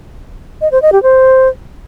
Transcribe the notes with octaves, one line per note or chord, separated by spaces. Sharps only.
D#5
C5
D#5
G4
C5